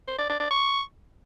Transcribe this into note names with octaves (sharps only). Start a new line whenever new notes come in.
C5
D5
D5
D5
C#6